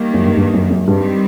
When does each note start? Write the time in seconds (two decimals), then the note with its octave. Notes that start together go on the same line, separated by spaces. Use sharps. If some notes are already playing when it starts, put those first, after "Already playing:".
Already playing: D#3 G3 A#3
0.14 F#2
0.25 G2
0.37 G2
0.53 F#2
0.70 F#2
0.87 G2 D#3 G3 C4